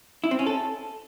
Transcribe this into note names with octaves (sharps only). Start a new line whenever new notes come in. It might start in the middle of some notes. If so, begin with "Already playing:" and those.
E4
C4
C#4
A4